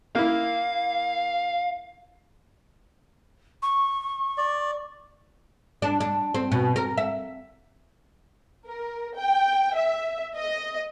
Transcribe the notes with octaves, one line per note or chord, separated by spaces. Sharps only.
A#3 E4 F5
C#6
D5
D4
D4
C4
B2
A#4
E5
A#4
G5
E5
D#5